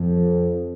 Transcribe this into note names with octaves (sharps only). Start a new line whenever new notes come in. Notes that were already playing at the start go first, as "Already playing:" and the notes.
Already playing: F2